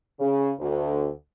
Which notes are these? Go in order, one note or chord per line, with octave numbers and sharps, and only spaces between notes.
C#3
D2